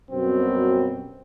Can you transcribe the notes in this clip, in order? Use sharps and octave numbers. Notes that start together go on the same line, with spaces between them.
F#2 B2 G3 C4